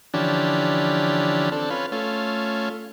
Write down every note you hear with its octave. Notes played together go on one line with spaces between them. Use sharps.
D3 E3 F3 C#4 D4 G4
C4 D4 A4
C#4 F4 B4
A3 C#4 F4